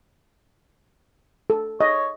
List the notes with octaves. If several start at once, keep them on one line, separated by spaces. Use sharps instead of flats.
A4
C#5 D#5